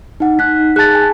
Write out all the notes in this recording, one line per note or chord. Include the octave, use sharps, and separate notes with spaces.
D#4 F#5
D#4 F#6 B6
G#4 A5 F#6 A6
G#5